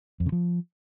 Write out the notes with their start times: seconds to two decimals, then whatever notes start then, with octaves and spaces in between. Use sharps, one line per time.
0.20 F2
0.26 C#3
0.32 F3